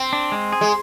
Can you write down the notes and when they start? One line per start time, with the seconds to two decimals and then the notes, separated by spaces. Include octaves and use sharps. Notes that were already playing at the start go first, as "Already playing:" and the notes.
Already playing: C4
0.13 D4
0.32 G#3
0.53 G#4
0.61 G#3